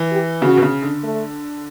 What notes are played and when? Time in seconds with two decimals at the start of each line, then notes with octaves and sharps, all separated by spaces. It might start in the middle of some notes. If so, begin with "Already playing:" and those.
Already playing: E3
0.11 G4
0.42 C#3 F#4
0.57 B2
0.63 C#3
0.82 D3
1.03 A3